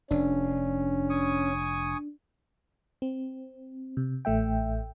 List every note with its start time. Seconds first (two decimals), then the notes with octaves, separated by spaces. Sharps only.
0.11 F1 C#4 D4
1.10 G#5 C#6 D#6
3.02 C4
3.97 C3
4.25 A1 A3 E5 G5